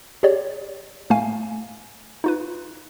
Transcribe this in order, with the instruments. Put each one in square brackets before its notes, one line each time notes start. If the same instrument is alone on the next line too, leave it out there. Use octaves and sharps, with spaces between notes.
[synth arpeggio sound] G4 G#4 C#5 D5
A2 A3 F5 G#5
D#4 F4 B4